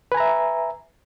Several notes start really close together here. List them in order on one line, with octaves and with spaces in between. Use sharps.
B4 G#5 A#5 E5